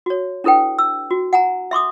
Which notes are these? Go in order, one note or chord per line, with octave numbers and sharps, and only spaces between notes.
F#4 C#5
D4 E4 A4 B4 G5
E6
F#4
F#5 G#5 A#5
E5 C6 D6 D#6